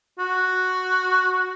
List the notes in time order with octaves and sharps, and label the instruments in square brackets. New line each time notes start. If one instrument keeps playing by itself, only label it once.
[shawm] F#4